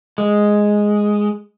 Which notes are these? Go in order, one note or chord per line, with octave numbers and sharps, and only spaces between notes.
G#3